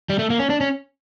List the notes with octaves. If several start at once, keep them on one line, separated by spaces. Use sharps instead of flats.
G3
A3
A#3
C#4
D4
C#4